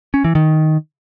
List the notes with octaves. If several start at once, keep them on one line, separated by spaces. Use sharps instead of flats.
C#4
E3
D#3